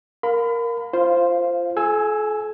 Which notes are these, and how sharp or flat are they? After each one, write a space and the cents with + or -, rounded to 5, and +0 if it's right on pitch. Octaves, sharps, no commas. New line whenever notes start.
A#4 +0 F5 +20 B5 +35
F4 -20 C5 +0 F5 +0
A4 -45 G#5 +0 E6 +0